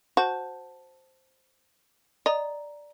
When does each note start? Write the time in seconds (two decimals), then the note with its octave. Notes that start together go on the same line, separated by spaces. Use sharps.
0.17 F#4 C5 A5 G6
2.26 D5 D#5 A#5